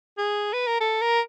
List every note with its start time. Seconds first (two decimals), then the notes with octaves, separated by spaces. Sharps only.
0.18 G#4
0.53 B4
0.67 A#4
0.81 A4
1.01 A#4